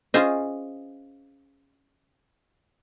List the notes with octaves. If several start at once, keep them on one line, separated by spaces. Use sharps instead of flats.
C#4 F4 G#4 C5 D#5